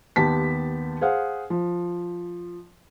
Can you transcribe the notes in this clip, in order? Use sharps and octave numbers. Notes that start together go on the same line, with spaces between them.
D#2 B3 G4 A5 B6
G#4 C5 F5 F#5
F3